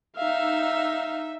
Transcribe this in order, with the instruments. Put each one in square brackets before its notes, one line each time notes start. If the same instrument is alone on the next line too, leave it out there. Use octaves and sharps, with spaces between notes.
[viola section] D#4 E5 [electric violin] F5